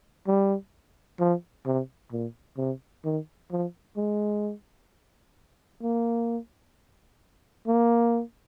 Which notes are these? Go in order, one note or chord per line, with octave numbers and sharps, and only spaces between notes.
G3
F3
C3
A#2
C3
D#3
F3
G#3
A#3
A#3